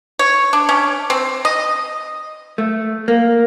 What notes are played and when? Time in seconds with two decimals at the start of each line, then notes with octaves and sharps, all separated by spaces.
0.19 C#5
0.53 D4
0.69 C#4
1.10 C4
1.45 D#5
2.58 A3
3.08 A#3